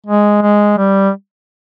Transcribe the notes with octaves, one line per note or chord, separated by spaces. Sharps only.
G#3
G#3
G3